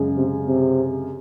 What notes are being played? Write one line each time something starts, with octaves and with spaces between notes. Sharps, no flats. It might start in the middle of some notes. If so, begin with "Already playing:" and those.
Already playing: F#2 C#3 G#3
C3
C3